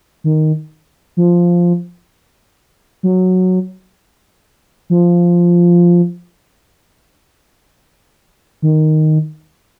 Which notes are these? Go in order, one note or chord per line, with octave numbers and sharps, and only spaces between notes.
D#3
F3
F#3
F3
D#3